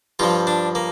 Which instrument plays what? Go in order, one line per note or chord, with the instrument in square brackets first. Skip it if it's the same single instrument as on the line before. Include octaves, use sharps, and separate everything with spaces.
[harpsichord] G2 F3 F4
D4
A#3